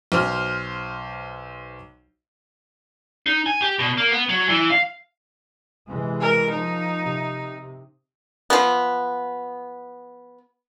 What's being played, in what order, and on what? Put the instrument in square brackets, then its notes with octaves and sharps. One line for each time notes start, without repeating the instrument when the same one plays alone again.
[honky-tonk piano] B1 C5 F6
[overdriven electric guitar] D#4
G#5
G4
B2
A#3
B3
F#3
E3
F5
[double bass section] C3 E3 G#3
[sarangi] A#4
[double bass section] F3 [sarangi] D#4
[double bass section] C3
[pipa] F3 B3